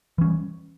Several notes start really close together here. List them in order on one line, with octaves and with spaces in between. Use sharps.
E3 C#4 G3